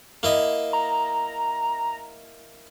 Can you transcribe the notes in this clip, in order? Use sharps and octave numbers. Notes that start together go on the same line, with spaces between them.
A#3 E4 D#5
A#5